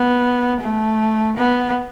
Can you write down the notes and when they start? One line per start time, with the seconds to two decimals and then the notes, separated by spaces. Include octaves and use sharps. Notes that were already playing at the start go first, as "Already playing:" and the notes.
Already playing: B3
0.61 A3
1.38 B3